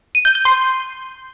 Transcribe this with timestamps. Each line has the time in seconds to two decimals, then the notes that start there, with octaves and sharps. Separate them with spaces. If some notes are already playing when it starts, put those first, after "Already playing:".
0.15 D#7
0.25 G6
0.35 G6
0.45 C6